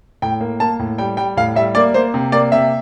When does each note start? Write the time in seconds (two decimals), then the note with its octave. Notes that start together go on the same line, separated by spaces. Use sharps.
0.22 A2 G5
0.40 A#3
0.60 A#3 A5
0.80 A2
0.98 G3 G5
1.17 G3 G5
1.37 A2 F5
1.56 G3 E5
1.75 A#3 D5
1.94 A#3 C5
2.14 C3
2.32 A#3 D5
2.52 C3 E5